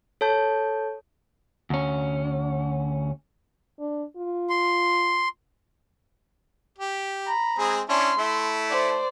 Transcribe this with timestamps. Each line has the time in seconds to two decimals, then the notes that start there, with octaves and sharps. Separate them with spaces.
0.21 A4 C#5 A5 G6
1.70 D2 C#4
3.79 D4
4.17 F4
4.50 C6
6.79 G4
7.26 A#5 B5
7.59 G#3 C4 G#4
7.89 C#4 D4 E4 C6
8.18 A3 E4
8.69 C5 D5